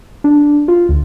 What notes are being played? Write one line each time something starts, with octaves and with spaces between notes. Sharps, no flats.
D4
F4
D2